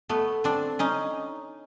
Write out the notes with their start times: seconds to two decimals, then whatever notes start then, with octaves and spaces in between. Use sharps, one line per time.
0.09 A3 B3
0.44 C4 D4
0.79 C#4 D#4